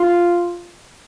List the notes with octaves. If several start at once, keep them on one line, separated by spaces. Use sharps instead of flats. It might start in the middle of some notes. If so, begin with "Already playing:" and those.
Already playing: F4